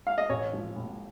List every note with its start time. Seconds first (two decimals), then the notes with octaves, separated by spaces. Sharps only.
0.07 F5
0.18 D#5
0.29 A1 C#5
0.53 F3
0.76 A2